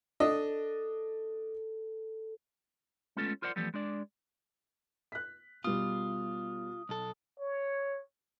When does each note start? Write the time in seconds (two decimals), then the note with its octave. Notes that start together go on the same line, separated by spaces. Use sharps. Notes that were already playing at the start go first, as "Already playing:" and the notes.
0.20 D4 A4 D#5
3.17 G#3 A3 B3 C#4 F4 A4
3.42 F4 A#4 C5 D5 F#5 C6
3.56 E3 F3 G3 A3 B3
3.74 G#3 D4 D5
5.12 F#6 B6
5.64 B2 G3 F4 D#6
6.89 B1 A4
7.40 C#5